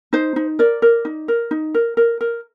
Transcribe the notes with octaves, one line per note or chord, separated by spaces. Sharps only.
D#4 C5
D#4
A#4 D5
A#4
D#4
A#4
D#4
A#4
A#4
A#4